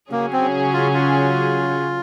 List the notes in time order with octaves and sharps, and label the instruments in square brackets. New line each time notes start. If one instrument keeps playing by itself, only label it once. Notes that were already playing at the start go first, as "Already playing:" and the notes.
[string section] C#3 F#3 C#4 G#4 [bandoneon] A#3
[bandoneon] C4
F4
F4